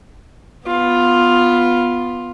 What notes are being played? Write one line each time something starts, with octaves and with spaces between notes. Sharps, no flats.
B3 F4